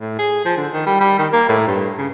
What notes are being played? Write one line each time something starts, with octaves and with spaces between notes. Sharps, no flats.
A2
G#4
F3
D3
D#3
G3
G3
D#3
A#3
A2
G2
C#3